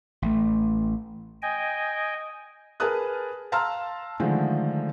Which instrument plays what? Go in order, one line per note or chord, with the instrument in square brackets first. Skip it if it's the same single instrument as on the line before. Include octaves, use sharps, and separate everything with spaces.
[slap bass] A1 A3
[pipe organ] D#5 G5 G#5
[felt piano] G#4 A#4 B4 A5 D#6 F#6
F5 A5 A#5 C6 E6 F6
D3 D#3 F3 G#3 A3